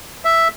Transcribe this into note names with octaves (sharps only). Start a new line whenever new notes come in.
E5